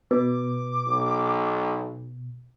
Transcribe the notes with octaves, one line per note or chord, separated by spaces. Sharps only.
B2 B4 D6
B1